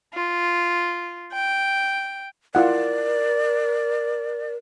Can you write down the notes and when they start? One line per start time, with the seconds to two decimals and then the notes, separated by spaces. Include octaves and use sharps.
0.14 F4
1.34 G5
2.55 E4 F4 A#4 D5 F#5